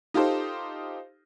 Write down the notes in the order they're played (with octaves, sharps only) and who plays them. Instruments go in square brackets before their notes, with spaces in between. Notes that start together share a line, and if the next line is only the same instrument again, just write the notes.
[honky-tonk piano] D#4 F4 G4 A4 C5